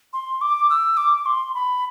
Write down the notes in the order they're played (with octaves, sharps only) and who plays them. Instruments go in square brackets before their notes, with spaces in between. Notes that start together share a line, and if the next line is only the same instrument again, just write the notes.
[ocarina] C6
D6
E6
D6
C6
B5